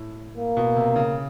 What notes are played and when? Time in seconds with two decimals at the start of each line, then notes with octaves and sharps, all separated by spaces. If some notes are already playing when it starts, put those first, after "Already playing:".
Already playing: A2
0.37 A#3
0.57 B2
0.76 C3
0.96 C#3